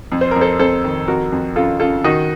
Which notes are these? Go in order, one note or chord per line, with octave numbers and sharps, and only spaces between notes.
F2
C5
F2 A#4
A4 C5
F2 A4 C5
D#3
F2 F#4 A#4
F2
C#3 F4 A4
C#3 F4 A4
D#3 D#4 F#4